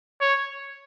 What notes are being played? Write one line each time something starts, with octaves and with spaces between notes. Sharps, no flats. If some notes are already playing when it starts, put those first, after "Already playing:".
C#5